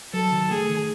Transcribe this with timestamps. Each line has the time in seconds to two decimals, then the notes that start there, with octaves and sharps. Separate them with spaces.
0.13 F#3 A4
0.32 D#3
0.50 A3 G#4
0.69 D#3